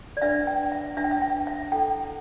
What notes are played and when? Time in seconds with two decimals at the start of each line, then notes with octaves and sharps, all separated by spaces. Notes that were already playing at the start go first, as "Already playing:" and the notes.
0.17 D5
0.22 D4 B4 E5
0.47 G5
0.72 E5
0.97 D4 B4 E5
1.04 G5
1.11 E5
1.22 G5
1.47 E5
1.72 E4 A4 G5